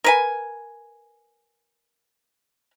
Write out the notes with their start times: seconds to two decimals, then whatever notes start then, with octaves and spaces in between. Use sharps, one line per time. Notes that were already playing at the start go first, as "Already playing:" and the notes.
0.04 A#4 B4 G#5